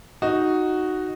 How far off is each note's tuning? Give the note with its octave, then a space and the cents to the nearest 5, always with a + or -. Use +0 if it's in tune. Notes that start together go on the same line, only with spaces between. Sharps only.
D#4 +0 F#4 +0